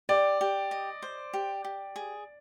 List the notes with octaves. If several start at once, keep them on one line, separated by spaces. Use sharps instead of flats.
G4 D5
G4
D#5
C5
G4
G4
G#4